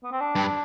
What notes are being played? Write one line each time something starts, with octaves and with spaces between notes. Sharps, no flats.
B3
C4
D4
G2